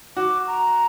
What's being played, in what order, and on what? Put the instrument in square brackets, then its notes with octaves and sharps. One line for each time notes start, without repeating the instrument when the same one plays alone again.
[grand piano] F#4 [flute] D6
[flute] A#5